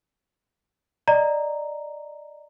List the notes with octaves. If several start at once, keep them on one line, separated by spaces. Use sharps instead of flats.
D5 D#5 A#5